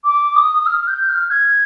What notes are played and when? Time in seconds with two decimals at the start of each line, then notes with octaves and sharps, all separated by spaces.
0.04 D6
0.35 D#6
0.66 F6
0.87 G6
1.09 F6
1.30 G#6